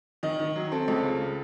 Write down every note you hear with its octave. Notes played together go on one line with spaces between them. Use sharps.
D#3 D#5
D#3
F#3
C4 A4
C#2
C#3